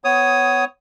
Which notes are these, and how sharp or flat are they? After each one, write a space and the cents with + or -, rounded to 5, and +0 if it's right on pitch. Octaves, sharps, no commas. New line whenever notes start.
B3 +25 C#5 +0 D#6 +0